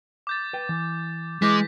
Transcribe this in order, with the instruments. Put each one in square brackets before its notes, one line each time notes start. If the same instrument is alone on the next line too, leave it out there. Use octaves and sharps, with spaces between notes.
[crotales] D6 G6 A6
[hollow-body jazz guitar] B4 G5
E3
[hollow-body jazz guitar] E3 E4 B4 [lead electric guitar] G#3 [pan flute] D6 [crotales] G6 A#6 B6